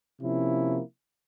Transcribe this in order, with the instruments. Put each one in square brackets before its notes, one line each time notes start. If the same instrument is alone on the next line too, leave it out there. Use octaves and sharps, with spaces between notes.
[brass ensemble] C3 F3 A#3 C#4 E4